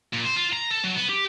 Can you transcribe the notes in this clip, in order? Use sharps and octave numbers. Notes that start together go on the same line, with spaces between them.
A#2
C5
F4
A#5
A4
F#3
B3
G4